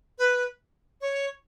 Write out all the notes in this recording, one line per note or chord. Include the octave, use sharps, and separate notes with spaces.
B4
C#5